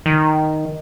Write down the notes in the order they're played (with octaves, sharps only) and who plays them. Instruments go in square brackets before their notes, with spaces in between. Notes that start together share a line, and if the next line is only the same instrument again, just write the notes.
[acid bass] D#3